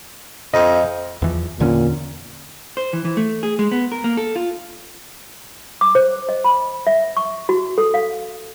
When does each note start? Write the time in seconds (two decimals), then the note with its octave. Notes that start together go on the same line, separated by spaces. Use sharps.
0.54 F2 D#5
1.22 E2 E3 F3
1.60 E2 A#2 D3 C#4
2.77 C5
2.93 E3
3.05 E3
3.17 A3
3.43 G#4
3.59 G#3
3.72 B3
3.92 A#4
4.04 A#3
4.17 A4
4.36 F4
5.81 D6
5.95 C5
6.29 D#5
6.44 B5
6.87 E5
7.17 C#6
7.49 F#4
7.78 A4
7.94 F5